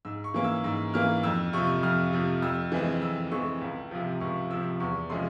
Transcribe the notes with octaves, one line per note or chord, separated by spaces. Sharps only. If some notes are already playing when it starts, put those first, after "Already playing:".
G#2 E6
C#6
E3 A#3 C#4
E6
G#2 E6
E3 A#3 C#4 F6
F2 E6
C3 F3 C#6
F2 F6
C3 F3
F2 E6
E3 G#3 C4
F2 E6
E3 G#3 C4 C#6
C#2
C3 F3
C#2 C#6
C3 F3 E6
E2 C#6
C3 F3 G#3 C#4 C6